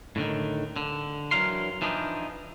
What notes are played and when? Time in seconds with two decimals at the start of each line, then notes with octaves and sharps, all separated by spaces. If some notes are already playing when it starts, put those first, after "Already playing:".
0.16 A2 D3 D#3
0.76 D3
1.31 E3 F#3 D4 A#4 F5 C6
1.82 E3 F3 D4 D#4